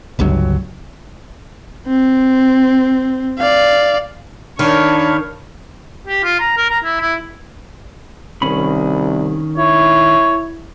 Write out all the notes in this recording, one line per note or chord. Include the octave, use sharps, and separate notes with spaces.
G1 C#2 G2 F#3
C4
D5 F5
D#3 D4 A#4 C#5 F5 B5
G4
F4
A#5
A#4
A#5
E4
E4
C2 D#3 C#4 B5
E4 C#5